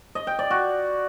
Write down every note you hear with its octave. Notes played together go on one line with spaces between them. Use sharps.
D#5
G5
D5
F#4